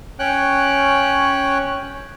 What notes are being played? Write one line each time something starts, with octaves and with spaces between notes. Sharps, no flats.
C#4 C#5 G5 F#6